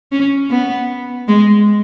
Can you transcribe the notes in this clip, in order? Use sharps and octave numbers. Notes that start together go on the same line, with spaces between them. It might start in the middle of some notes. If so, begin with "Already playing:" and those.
C#4
B3
G#3